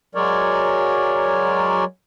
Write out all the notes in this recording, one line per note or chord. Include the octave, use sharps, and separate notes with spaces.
F#3 G#3 A#4 C#5 D5